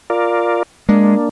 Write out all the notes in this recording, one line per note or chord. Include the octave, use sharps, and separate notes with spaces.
F4 A#4 D5
G#3 A#3 D4